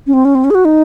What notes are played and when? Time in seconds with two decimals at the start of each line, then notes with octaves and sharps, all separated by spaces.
0.07 C#4
0.13 C4
0.25 C#4
0.35 C4
0.44 C#4
0.50 G#4
0.55 F#4
0.65 D#4